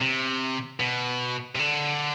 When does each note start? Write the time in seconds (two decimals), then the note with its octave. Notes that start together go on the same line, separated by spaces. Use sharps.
0.01 C3
0.80 B2
1.55 C3
1.59 D3